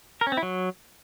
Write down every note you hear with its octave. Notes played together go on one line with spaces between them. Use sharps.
A#4
C#4
C4
E4
F#3